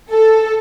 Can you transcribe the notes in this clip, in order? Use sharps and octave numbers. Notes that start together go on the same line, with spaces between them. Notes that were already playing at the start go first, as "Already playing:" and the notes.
A4